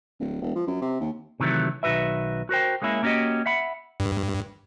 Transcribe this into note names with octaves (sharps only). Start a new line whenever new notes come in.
D1
E1
F3
F#2
C3
D#2
C3 D#3 E3 F#3 A3
B1 D#3 F3 F#4 B4 E5
F#4 A#4 C5 G5
G#3 A#3 C#4 E4
A#3 C#4 F#4 G4 D#5
E5 F#5 B5
G2